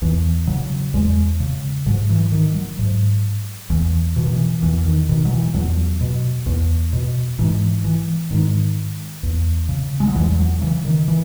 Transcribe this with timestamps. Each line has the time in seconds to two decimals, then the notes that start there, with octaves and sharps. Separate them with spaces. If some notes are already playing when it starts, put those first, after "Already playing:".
0.02 E2 E3
0.47 C#3 F#3
0.94 E2 G#3
1.40 C#3
1.86 G#2 F#3
2.10 E3
2.32 D#3
2.55 F#3
2.79 G#2
3.70 E2 E3
4.16 B2 E3
4.25 D#3
4.33 E3
4.62 E2 E3
4.85 D#3
5.09 B2 D#3
5.25 F#3
5.31 E3
5.54 E2 F#3
6.01 B2
6.46 E2
6.93 B2
7.39 G#2 E3
7.84 E3
8.31 G#2 D#3
9.23 E2
9.69 C#3
10.00 G#3
10.08 F#3
10.15 E2 E3
10.39 F#3
10.61 C#3 E3
10.85 D#3
11.08 E3